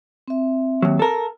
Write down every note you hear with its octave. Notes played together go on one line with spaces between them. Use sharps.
C4 E5
D#2 F#3
A4 A#4